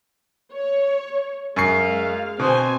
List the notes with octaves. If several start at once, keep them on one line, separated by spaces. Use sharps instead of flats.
C#5
F#2 G#3 F5 C#6 C7
B2 C4 C5 G#5